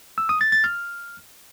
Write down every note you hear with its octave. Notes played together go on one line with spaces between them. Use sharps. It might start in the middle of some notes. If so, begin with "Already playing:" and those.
E6
D#6
A6
A6
F6